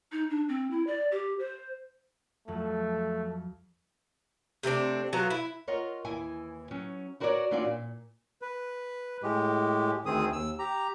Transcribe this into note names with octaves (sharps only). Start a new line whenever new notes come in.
D#4
D4
C4
E4
D5
G4
C5
F2 F#3 A3
C3 A3 C4 D4
F#3 B3 F4 A4
E4
F4 A#4 C#5 D#5 F#5
D#2 E3 E4 G#5
F#3 C#4
E4 F#4 A#4 B4 C#5 D5
E3 C#4 D4 F4 F#4 D5
A#2
B4
A2 G#3 G4
D2 D#3 C4 G#4 D#6
D#2 E6
G4 A#5